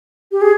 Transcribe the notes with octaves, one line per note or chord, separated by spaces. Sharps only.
G4
G#4